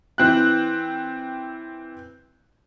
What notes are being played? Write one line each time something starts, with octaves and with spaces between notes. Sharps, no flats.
E3 C4 F#6